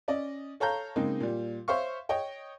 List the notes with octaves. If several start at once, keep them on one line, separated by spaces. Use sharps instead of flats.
C#4 D5 D#5
A4 C#5 F5 A#5 G6
C#3 G#3 A#3 C4 D#4
A#2 G3
C5 C#5 E5 F5 C#6
C#5 D#5 G5